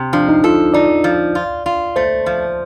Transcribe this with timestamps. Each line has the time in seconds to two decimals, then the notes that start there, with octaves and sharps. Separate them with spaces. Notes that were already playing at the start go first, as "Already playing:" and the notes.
Already playing: C3
0.13 F3 D4
0.29 D#4
0.44 F4 A4
0.74 D#4 D5
1.04 F3
1.35 F4
1.66 F4
1.96 A3 C5
2.26 F3